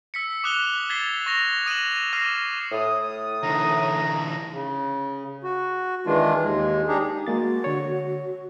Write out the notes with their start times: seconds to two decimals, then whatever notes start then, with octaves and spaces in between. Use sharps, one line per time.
0.14 E6 B6 C#7
0.44 D6 D#6 F#6 F7 G7
0.90 G#6 A6 B6 C7 G7
1.26 C#6 A#6 F7 G7
1.66 D#6 D#7 E7 F#7
2.13 D6 F6 A#6 C7 D#7
2.72 A2 D#6
3.43 D3 E3 A#5
4.53 C#3
5.44 F#4
6.06 D#3 E3 G#3 D4 F4
6.44 D#2 G#3
6.88 D4 D#4 G4 G#4
7.27 G#3 A#3 F#4 A6
7.64 D3 C#5